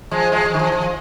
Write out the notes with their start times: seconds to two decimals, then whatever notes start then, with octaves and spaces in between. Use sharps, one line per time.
0.11 F3 G#3
0.32 F3 G#3
0.45 F3
0.54 D#3
0.59 F3
0.72 F3